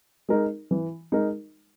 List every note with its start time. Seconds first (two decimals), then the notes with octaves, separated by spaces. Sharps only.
0.29 G#3 D#4 A#4
0.71 E3
1.12 G#3 D#4 A#4